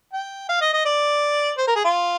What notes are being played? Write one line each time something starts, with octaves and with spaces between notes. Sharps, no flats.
G5
F5
D#5
D#5
D5
C5
A#4
G#4
F4